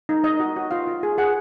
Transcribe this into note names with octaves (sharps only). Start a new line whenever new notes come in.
D#4
D#4 D#5
F#4
F#4
F4 F5
F4
G#4
G#4 F#5